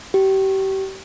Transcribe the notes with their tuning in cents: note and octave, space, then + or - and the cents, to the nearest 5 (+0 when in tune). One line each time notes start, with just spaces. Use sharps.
G4 -30